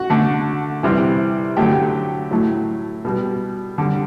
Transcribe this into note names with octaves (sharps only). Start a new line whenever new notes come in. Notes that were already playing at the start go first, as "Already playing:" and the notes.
Already playing: F#4 F#5
D3 A3
C3 E3 G3
D3 F#3 A3 G4 G5
A2 F#3 A3
B2 G3
D3 G3